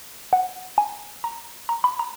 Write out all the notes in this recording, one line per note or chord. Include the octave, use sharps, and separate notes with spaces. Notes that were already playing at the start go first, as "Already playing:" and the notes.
F#5
G#5
A#5
A#5
B5
A#5